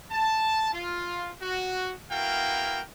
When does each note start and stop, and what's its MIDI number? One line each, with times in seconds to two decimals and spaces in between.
0.12 0.73 81
0.74 1.31 65
1.42 1.93 66
2.12 2.80 59
2.12 2.80 64
2.12 2.80 66
2.12 2.80 70
2.12 2.80 77
2.12 2.80 79